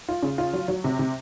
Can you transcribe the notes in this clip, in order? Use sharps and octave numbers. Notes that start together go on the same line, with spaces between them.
F4
C#3
F4
F#3
F#3
C3
C3